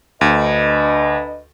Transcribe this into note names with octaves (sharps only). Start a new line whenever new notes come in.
D2 D4 B4 D#5